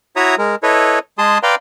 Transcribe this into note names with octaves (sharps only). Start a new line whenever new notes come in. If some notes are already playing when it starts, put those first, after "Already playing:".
E4 F#4 C#5 E5 A#5 D#6
G#3 A#4
E4 A4 B4 C#5 D#5
G#3 G#4 A5 C6 D#6
B4 D5 F5 G5 A#5 C6